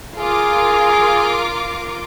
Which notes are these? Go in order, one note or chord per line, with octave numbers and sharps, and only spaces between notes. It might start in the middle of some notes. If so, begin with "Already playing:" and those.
F4 G#4 A#4 D6